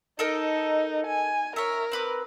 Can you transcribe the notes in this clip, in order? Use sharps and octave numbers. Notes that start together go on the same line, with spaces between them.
D#4 A4 A#4 D#5
G#5
A#4 C#5 E5
C4 B4 D6